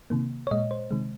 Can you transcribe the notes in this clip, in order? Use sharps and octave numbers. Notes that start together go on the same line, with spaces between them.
C3 D#3 A#3
C#5
A#2 G#3 D#5
C5
C3 D#3 G#3